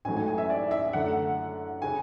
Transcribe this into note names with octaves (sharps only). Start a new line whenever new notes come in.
A1 G#2 F#3 A3 G#5
G#5
G#5
E5
D5
E5
F#2 D3 A3 F#5
C#3 G#5